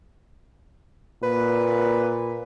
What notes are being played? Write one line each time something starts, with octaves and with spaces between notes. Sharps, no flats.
A#2 B4